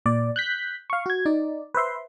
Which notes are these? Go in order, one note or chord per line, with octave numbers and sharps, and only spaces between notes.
A#2 D5
F#6 G6 B6
F5 C#6
F#4 G#6
D#4 D5
B4 C5 E5 C6